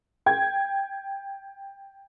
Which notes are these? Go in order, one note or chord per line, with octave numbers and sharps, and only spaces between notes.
G5 G#6